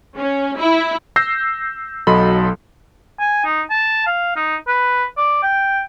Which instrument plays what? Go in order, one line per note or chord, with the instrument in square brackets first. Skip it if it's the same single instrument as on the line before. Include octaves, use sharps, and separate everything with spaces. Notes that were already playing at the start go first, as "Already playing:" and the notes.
[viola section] C#4
E4
[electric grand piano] E6 G6 A#6 C7
B1 F#3 A4 D#5 B5 C6
[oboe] G#5
D#4
A5
F5
D#4
B4
D5
G5